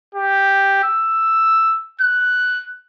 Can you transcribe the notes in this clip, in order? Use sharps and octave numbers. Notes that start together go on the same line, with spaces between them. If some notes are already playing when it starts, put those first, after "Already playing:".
G4
E6
F#6